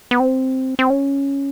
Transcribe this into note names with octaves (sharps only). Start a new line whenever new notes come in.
B3
C4
C4
C#4